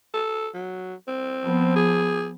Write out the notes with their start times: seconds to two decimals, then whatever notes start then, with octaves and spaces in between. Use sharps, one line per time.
0.14 A4
0.54 F#3
1.08 C4
1.44 F3 B3
1.76 G#4